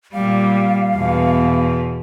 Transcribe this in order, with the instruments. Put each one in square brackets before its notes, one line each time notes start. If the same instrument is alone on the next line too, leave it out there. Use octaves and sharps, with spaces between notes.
[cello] A#2 G3 [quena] F5
[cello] E2 B2